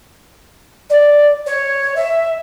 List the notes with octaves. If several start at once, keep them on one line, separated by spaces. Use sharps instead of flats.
D5
C#5
E5